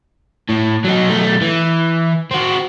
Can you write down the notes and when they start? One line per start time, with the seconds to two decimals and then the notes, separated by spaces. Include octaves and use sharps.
0.49 A2
0.84 F#3 D#4
1.09 B1 A3
1.41 E3
2.31 C4 F#4